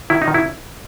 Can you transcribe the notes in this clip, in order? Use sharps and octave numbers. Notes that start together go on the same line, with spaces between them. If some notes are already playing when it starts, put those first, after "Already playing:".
D#3 E4
D#4
D#3
E4